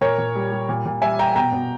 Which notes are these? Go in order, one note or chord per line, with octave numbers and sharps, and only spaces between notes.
A#2 A#4 C#5
A#2
G3
G3
A#2
A#2
G3 E5 G#5
G3 G5 A#5
B2 G5 A#5
B2